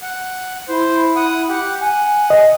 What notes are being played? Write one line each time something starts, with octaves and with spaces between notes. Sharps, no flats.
F#5
E4 C5
F#5 D#6
G4 F#5
F#5 G#5
D#5